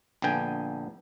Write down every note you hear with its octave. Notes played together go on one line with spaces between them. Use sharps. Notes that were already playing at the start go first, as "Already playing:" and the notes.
A#1 D3 B3 G5 G#5